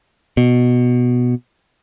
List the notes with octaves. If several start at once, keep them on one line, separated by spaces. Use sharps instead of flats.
B2